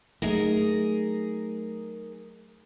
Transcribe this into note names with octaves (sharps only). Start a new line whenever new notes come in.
F#3 A3 D#4 G#4 A#4